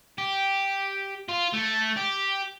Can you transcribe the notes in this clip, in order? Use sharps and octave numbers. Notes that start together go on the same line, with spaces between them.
G4
F4
A3
G4